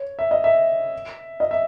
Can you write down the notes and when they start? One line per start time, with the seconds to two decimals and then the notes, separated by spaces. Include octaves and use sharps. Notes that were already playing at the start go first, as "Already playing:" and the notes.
Already playing: C#5
0.19 E5
0.31 D#5
0.44 E5
1.40 D#5
1.51 E5